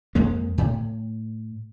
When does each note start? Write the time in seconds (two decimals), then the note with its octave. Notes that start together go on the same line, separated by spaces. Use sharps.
0.15 F2 G#3 A#3
0.58 A2